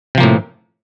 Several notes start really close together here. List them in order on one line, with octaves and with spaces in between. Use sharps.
C3 F3 A#3 A2